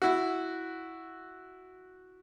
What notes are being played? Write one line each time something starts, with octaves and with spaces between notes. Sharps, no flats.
E4 F#4